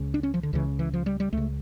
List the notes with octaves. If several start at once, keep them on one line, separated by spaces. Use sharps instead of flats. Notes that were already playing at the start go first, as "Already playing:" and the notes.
Already playing: C#2 C#3
D4
C#4
F3
D3
C#2 C#3 E3
E3
F3
G3
G3
C#2 C#3 A3